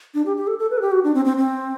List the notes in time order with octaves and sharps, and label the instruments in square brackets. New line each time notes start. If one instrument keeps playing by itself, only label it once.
[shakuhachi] D4
G4
G4
A4
A4
B4
A4
G4
F#4
D4
C4
C4
C4